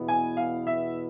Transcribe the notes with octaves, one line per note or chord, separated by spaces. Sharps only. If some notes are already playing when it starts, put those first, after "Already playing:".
Already playing: E2 B2 B3 E4
G#5
F5
E5